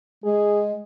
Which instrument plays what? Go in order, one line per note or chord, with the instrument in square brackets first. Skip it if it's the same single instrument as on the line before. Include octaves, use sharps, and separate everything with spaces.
[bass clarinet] G#3 [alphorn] G#4